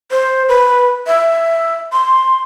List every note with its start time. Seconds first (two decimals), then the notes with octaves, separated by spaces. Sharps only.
0.11 C5
0.49 B4
1.07 E5
1.92 C6